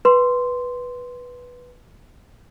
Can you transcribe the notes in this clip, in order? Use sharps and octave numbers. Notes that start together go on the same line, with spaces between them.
B4 C6